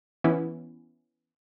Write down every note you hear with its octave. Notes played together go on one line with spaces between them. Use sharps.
E3 B3 C#4 E4